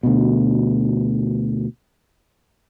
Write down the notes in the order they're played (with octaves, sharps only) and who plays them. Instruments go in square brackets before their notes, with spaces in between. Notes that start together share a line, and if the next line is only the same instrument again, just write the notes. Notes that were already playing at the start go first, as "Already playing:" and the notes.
[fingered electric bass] D2 B2